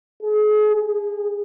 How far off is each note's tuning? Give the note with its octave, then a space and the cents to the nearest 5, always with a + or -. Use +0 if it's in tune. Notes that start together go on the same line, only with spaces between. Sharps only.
G#4 +35
G#4 -30